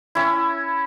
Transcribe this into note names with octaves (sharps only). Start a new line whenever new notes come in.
C#4 E4